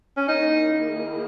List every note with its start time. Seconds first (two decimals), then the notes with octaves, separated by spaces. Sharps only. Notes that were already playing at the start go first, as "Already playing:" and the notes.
0.17 C#4
0.27 D#3 A#3 D#4 E4 G#4